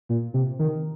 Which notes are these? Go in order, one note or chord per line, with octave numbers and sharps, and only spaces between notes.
A#2
C3
D#3